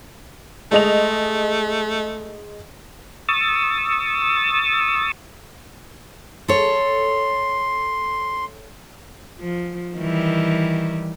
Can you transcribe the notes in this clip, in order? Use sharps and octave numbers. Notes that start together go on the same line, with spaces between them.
G#3 A3 D#5 F7
C#6 D#6 E6 A6
A4 C#5 C6
F3
D#3 E3 G3